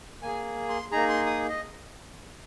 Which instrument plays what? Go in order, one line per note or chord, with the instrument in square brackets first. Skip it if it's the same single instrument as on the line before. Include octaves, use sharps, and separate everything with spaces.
[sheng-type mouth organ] A#3 G#4 G#5
C6
A#3 D#4 G#4 A#5
C6
D#6
D#5